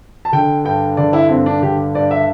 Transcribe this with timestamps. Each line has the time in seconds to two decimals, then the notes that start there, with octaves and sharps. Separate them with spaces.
0.25 A5
0.33 D3 G5
0.65 G2 G5
0.97 D3 D5
1.13 E4
1.29 G2 C4
1.46 D4
1.62 D3 G4
1.94 G2 D5
2.11 E5